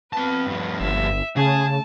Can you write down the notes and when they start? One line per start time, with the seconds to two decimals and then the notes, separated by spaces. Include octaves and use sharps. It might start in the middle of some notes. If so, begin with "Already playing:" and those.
0.13 B3 C4 B4 A5
0.47 G2 F3
0.81 G1 E5
1.37 C#3 A3 G#4 A5